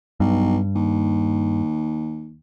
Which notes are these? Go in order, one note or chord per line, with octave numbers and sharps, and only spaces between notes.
B1 G2
D#2